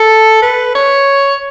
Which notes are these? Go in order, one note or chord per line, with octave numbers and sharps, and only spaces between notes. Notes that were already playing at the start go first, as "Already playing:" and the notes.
Already playing: A4
B4
C#5